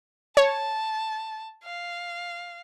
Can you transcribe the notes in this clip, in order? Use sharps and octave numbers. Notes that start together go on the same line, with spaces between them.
C#5 A5
F5